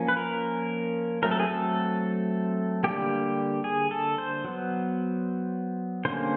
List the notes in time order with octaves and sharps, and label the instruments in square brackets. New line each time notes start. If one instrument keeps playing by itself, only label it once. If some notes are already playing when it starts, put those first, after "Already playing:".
Already playing: [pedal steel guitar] F3 A#3 C#4
B4
A#4
F#3 A3 C4 A#4
A4
G#4
A4
D3 G3 A#3 G4
G#4
A4
C5
F#3 B3
D3 G3 A#3 C#4 C5